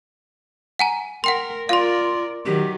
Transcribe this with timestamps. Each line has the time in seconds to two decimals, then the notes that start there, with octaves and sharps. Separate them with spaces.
0.79 F#5 G#5 A#5
1.24 A#4 F#5 G5 C6
1.69 F4 A#4 D5 F5 C6
2.46 D#3 F#3 G4